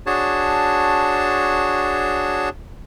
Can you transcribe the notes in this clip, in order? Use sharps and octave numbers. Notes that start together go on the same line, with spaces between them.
D4 F#4 G#4 C#5 A5